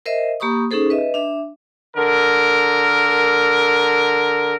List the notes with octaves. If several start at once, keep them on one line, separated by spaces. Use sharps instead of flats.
A#4 C5 D#5 E5
A#3 G4 B5 C#6 D#6
C#4 D#4 G#4 A4 C5
B4 D#5 E5
D4 E5
D3 A#4